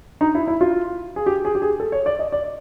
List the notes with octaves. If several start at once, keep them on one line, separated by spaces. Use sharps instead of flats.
D#4
E4
E4
F4
G#4
G4
G#4
G4
G#4
A4
C#5
D5
D#5
D5